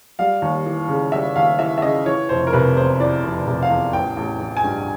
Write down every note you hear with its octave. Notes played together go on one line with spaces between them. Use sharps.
G3 F5
D#2
E3
C#3
G3 E5
D#2 F5
E3 E5
E5
C#3 D#5
E3 C#5
F1 C5
A#4
C3 B4
E2 C5
E3 D5
F1
C3
F5
E2
A1 G5
A1
E3
G#5
G2